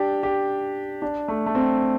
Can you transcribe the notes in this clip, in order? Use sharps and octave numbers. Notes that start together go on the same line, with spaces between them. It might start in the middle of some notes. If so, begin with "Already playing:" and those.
Already playing: D4 G4
G4
D4
A3
A3
C4